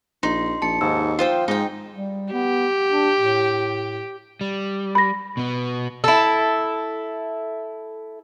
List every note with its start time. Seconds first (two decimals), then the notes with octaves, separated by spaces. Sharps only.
0.23 A#1 D#4 C6
0.62 A#1 A5 C#7
0.81 D#2 G#2 E6
1.19 F3 F4 C5 G5
1.48 G#2 D#4 G5
1.91 G3
2.33 B3 G4
2.89 D4
3.20 A2
4.41 G3
4.95 B5 A#6
5.37 B2 B3
6.04 E4 A4